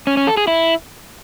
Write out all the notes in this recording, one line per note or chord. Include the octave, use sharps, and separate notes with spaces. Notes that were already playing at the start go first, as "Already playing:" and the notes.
C#4
C#4
A4
G#4
E4